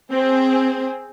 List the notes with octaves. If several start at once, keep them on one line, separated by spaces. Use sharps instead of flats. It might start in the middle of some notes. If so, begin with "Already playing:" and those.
C4 G#4